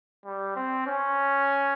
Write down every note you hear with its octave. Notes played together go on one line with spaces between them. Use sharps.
G3
C4
C#4